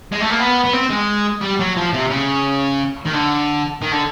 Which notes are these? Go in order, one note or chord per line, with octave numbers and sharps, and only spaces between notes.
G#3
A3
A#3
B3
B3
C4
G#3
G3
F#3
F3
C3
C#3
D#3
D3
D#3
D3